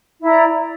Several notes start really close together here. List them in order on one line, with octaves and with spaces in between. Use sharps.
E4 A#5 D5